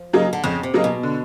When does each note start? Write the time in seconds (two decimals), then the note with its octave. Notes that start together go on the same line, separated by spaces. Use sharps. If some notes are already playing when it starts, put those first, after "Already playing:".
Already playing: F3
0.13 C#3 F#3 A#3 D#4
0.33 D3
0.44 F2 C#3
0.63 C3
0.74 C#3 F#3 A#3 D#4
0.84 B2
1.03 D3